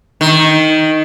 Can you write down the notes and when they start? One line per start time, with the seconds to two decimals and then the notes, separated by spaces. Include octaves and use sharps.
0.21 D#3